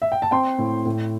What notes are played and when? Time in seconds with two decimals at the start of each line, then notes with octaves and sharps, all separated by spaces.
0.02 E5
0.12 G5
0.22 A5
0.31 C4 G5 C6
0.58 A2
0.86 A2